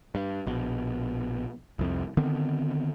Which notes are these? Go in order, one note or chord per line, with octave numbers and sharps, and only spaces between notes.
G2
A#1 B2
C2 F2 C3
D3 D#3 B3 C4